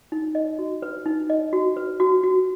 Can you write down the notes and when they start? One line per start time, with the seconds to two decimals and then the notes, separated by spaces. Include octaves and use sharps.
0.12 D#4
0.35 D#5
0.58 F#4
0.82 B4
1.06 D#4
1.30 D#5
1.53 F#4
1.77 B4
2.00 F#4
2.23 F#4